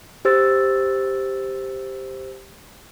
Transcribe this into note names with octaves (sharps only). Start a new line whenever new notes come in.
G4 C5 E6 A6